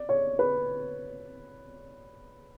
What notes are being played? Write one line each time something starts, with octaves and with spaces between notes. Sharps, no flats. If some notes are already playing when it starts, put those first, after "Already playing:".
Already playing: D5
C#5
B4